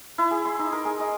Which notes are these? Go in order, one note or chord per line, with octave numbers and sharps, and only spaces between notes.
E4
G#4
C6
D#4
A#4
G#4
D#5